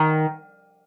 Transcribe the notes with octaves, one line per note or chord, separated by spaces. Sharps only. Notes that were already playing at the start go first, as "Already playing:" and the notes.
Already playing: D#3